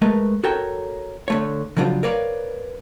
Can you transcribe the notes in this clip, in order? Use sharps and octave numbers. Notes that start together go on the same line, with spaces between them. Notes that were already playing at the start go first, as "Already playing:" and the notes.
G#3 A3 A#4 B4
F#4 A4 A#4 C#5 G5
D3 A3 C#5
C#3 F3 F#3 D4 F4 C5
A#4 B4 C#5 D5 F5